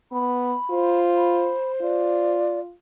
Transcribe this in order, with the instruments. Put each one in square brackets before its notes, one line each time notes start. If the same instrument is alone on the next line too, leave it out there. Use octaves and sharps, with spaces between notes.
[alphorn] B3 [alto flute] B5
[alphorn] F4 [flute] C5
[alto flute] B5
[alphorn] F4 [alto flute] D5